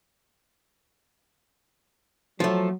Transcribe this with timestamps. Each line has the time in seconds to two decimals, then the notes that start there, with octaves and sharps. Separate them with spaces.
2.40 F3 F#3 A3